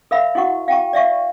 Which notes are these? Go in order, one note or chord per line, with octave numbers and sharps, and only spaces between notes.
A#4 E5 F5 B5
E4 F#4 F#5 C#6
F5 G5 A5 A#5 C#6
D5 E5 F5 C#6